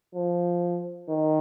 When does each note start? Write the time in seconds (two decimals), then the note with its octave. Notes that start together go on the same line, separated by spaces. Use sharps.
0.15 F3
1.09 D#3